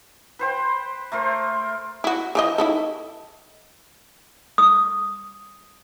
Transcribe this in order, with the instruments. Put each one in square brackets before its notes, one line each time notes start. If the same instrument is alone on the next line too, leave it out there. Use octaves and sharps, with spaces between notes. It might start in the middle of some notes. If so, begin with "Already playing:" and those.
[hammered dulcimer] B4 C5 G5
A3 A#4 C5
[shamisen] E4 F#4
E3 F3 D#5
D#4 E4 A4
[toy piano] D#6